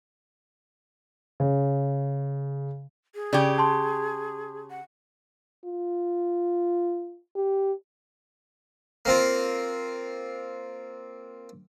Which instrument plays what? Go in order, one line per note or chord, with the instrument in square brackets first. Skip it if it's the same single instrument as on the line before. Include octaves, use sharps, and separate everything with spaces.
[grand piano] C#3
[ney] G#4
[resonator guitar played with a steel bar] C#3 G4 [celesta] D5
[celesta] A5 C6
[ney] F#5
[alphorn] F4
G4
[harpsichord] A#3 C4 F4